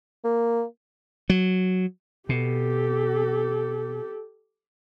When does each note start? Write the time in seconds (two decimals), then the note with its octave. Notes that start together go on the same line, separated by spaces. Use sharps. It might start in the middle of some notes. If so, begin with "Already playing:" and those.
0.24 A#3
1.30 F#3
2.29 B2 G4 A4